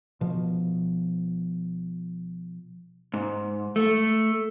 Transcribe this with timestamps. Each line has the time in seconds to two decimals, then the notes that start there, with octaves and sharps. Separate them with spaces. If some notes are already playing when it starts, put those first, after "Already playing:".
0.21 B2 F3
3.14 G#2
3.76 A3